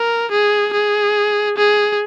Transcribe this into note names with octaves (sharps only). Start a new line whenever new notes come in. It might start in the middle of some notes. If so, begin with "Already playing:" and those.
Already playing: A#4
G#4
G#4
G#4